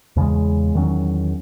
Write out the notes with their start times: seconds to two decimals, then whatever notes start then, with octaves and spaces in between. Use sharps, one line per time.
0.16 E2 C#3 G#3
0.75 E2 D#3 F#3 C#4